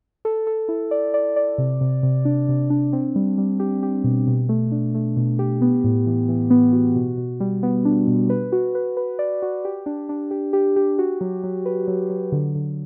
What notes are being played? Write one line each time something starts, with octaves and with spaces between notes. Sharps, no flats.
A4
A4
E4
D5
D5
D5
C3
C3
C3
D4
C3
D4
C4
G3
G3
G4
G4
B2
B2
A3
D4
A3
B2
G4
B3
A2
E3
E3
B3
F#4
B2
B2
G3
B3
D4
B2
B4
F#4
B4
B4
D5
F#4
G4
D4
D4
G4
G4
G4
F#4
F#3
F#3
B4
F#3
F#3
D3
D3